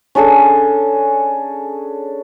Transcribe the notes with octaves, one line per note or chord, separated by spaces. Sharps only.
C#4 D4 G#4 A4